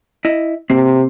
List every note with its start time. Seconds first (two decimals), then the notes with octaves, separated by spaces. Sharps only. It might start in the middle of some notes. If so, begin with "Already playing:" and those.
0.25 E4 D#5
0.70 C3 A#3 C4